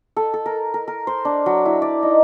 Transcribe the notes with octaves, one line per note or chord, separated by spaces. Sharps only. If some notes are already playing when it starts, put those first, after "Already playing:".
A4
A4
A#4
A#4
A#4
C5
D4
F#3
E4
D5
D#4